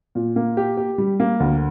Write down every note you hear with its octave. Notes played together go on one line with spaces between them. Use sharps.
A#2
A#3
G4
G4
G3
A#3
D2